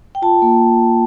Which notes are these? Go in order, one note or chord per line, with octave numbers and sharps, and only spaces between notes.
G5
F4 A5
A#3